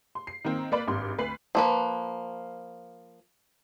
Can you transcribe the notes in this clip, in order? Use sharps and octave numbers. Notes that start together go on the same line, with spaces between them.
C6
C7
D#3 A#3 C4
A#3 B4 D5 B5
G#1 G2 C6
D2 B4 C7 F#7
F3 A#3 B4